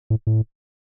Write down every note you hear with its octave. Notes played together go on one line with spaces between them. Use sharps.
A2
A2